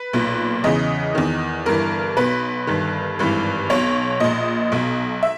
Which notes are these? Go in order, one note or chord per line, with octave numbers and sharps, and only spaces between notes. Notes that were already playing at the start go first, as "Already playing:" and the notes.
Already playing: B4
B1 A#2
E2 C#3 E3 D#5
E2 D#3
G1 G2 E3 A#4
B1 B2 B4
G1 G2 D#3
G#1 G2 E3
B1 B2 C#5
A#1 A#2 D#5
B1 B2
E5